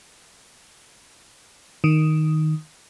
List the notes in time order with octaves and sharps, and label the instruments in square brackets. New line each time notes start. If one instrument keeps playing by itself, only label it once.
[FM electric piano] D#3